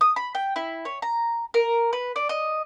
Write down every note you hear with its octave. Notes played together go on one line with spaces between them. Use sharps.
D#6
B5
G5
E4
C#5
A#5
A#4
B4
D5
D#5